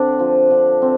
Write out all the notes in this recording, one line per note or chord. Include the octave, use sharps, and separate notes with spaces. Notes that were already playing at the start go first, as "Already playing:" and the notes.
Already playing: D3 C4 D4
F3
D3
C4